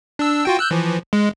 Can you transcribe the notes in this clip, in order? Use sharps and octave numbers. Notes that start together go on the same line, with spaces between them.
D4 E6
F4 F#4 G5
E6 F#6 G6
E3 F3
G#3